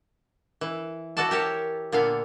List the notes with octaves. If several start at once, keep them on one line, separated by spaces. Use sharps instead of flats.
E3
E3 F#4 A4 D5 A5
G4 A#4 C#5 E5 A5
A#2 D3 B3 F5